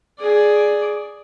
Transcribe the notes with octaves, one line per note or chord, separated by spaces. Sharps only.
G#4 D5